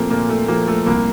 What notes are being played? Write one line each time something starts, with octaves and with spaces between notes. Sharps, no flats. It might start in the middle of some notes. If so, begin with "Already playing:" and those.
Already playing: A#2 F3 A3 A#3 C4
A#2 A#3
A3
F3 A3 A#3
A3
C2 A#3